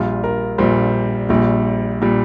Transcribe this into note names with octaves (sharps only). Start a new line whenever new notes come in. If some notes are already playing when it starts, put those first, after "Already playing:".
Already playing: A#1 A#2 G3 F4
A#4
A#1 A#2 G3 C5
A#1 A#2 G3
A#2 G3